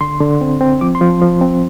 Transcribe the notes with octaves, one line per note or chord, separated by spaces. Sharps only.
D3 C6
D3
C4
C4
F3 D6
C6
F3
F3
C4